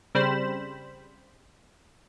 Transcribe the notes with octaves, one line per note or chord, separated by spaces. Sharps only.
C#3 G3 C4 C5 B5 E7